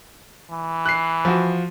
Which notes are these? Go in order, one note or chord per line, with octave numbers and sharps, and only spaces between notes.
E3
F#6 C7
F3 F#4